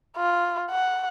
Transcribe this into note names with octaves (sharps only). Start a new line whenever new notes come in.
F4
F#5